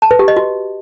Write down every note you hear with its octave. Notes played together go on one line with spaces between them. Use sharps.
A5
B4
G4
D#5
F#4